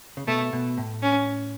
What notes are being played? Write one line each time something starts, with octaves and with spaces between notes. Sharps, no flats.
C#3
B2 A3
B2
A2
C#4